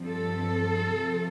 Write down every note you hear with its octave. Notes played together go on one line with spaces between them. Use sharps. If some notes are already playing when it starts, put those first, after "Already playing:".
Already playing: G2 F3 C4
A4
C3 F3 C4